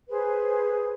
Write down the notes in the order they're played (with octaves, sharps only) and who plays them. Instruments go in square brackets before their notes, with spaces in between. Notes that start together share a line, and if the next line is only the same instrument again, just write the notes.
[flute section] G#4 B4 C5